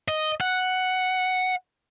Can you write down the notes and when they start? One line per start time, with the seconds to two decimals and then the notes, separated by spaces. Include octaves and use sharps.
0.08 D#5
0.41 F#5